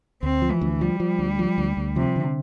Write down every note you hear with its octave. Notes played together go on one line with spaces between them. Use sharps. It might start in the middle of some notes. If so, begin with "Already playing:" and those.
D2 C4
F3
E3
D2
F3 G3
F3
D2
F3
D2
D2
C3 F3
D3